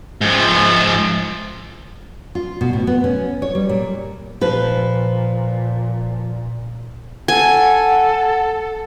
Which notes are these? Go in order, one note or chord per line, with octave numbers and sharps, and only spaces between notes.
G#2 F3
F4
B2
A2
B3
C#4
C#5
G3
A#2
A#2 F3 B4
A4 F#5 G#5